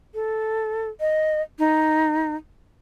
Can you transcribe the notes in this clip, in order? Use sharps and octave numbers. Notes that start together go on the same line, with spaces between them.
A4
D#5
D#4